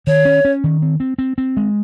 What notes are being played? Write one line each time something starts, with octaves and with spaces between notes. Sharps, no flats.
D#3 C#5
C#4
C#4
D#3
C4
C4
C4
C4
G#3